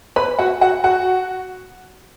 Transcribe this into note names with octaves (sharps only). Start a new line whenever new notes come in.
B4 B5
F#4 F#5
F#4 F#5
F#4 F#5